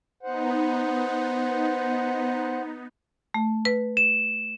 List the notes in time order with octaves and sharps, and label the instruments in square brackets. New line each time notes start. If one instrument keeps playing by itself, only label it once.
[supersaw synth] B3 D#4 [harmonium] C5 F#5
[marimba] A3
B4
[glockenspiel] E7